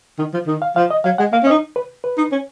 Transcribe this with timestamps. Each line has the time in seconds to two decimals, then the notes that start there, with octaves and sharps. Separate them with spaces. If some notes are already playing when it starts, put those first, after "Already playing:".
0.19 D#3
0.33 F3
0.47 D#3
0.62 F5
0.76 F3 F5
0.90 D#5
1.04 F#3 F5
1.18 G#3 F#5
1.33 A#3 F5
1.43 C#4
1.47 D#5
1.51 D#4
1.76 B4
2.04 B4
2.18 D#4
2.32 C#4